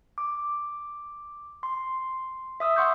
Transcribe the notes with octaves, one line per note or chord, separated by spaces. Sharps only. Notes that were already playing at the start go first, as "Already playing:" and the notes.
D6
C6
E5 D#6 E6
F#5 C6 C#6 D#6 G6